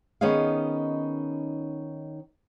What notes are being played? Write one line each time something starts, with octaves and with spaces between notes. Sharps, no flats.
D#3 B3 C#4 D#4 G#4 F5